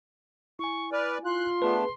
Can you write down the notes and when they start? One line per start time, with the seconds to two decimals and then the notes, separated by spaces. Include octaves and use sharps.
0.59 E4 G#5 C#6
0.92 B4 D5 F6
1.25 F4 C6 F#6
1.62 A3 B3 D4 G#4 B4